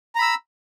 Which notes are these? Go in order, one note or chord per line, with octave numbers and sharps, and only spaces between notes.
A#5 B5 E6